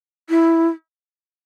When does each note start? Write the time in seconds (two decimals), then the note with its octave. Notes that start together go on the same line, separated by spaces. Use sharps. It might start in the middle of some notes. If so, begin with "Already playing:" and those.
0.29 E4